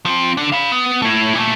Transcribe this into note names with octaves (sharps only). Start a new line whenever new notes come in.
F3 C4
D3 D4
F5 B5
B3
A3 E4
A#2 A3